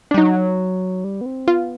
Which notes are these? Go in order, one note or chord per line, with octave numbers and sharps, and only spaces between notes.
D4
G3
F#3 D#4
G3
B3
C4
B3 F4